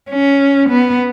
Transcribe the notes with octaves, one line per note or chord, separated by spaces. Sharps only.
C#4
B3